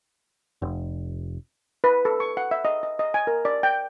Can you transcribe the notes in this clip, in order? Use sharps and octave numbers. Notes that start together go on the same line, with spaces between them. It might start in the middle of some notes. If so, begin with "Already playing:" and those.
F1
B4
A4
C#6
F#5
E5
D#5
D#5
D#5
G#5
A#4
D5
G5